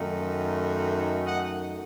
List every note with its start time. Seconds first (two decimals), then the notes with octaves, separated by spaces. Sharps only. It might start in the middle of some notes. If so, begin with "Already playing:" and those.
Already playing: F#2 D#3 A3 D#4
1.24 D#5 F#5